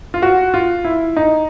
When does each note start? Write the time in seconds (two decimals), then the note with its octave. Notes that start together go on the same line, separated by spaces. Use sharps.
0.14 F4
0.22 F#4
0.54 F4
0.85 E4
1.17 D#4